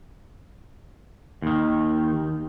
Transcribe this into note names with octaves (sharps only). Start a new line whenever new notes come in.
D#2 D#3